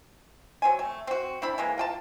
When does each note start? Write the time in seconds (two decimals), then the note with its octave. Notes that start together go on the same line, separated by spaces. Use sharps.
0.62 F#3 C4 G#5
0.79 A3
1.07 C4 F#4
1.42 C4 D4 E4 B5
1.58 E3 G#3 A#3
1.78 F4 G5 A5